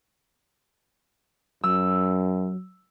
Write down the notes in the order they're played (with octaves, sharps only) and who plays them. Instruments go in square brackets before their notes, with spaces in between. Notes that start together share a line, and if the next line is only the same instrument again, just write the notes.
[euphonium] F#2 [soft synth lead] F#3 [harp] E6